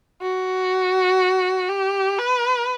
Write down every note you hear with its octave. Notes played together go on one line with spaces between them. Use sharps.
F#4
G4
B4